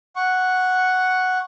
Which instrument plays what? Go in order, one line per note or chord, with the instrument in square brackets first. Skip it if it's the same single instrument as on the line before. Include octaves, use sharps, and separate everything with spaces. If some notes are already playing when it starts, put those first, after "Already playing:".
[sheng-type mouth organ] F#5 C#6